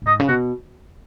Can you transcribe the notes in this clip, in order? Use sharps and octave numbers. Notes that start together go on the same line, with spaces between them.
B2
G#2 D#5
C#3
B2 F#4